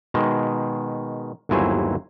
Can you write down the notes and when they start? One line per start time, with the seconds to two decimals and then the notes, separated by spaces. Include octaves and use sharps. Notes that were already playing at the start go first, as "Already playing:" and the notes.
0.14 B2 D#3 G#3
1.49 G1 D#2 F#3 E4 C5 G#5